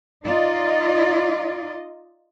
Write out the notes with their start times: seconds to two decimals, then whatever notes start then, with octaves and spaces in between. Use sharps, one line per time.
0.24 D#4 F4 D5 D#5